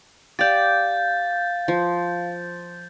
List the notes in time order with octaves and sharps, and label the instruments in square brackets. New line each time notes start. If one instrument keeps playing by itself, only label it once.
[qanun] G4 D5 [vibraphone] F5 [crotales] G6 A6
[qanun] F3